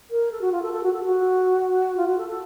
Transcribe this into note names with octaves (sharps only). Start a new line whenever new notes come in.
A#4
A4
F#4
F4
A4
A4
F#4
A4
F#4
F4
F#4
A4
A4